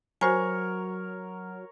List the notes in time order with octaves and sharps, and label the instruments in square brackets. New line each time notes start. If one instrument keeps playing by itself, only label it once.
[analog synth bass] F#3 [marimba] F#4 C5 G#5 [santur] A#4 C#5